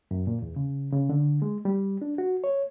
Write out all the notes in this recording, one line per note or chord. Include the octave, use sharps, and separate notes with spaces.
F#2
A#2
E2
C#3
C#3
D3
G#3
G3
D4
F#4
C#5